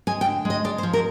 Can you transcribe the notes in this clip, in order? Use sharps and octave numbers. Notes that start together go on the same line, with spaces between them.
G#3 G#5
G5
D3
G#3 D#5
G#3 D5
C5
F3
A#4